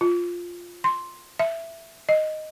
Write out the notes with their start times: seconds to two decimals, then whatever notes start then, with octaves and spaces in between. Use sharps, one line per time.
0.01 F4
0.84 C6
1.39 E5
2.09 D#5